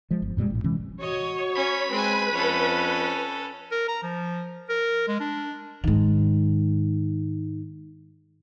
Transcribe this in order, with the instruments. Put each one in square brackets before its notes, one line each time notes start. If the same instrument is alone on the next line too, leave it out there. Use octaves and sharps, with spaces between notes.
[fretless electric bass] F3 G#3
G1
F#2 A#2 G3 G#3
A1 A2
C3 E3 G#3 C#4
[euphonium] F#4 [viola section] C#5 [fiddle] D#5
[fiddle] C#4 [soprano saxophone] B5
[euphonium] G#3 [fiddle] C4 G#5 [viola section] B4
[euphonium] F2 [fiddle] C#4 A4
[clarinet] A#4
A#5
F3
A#4
G#3
D4
[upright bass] G#2 D#3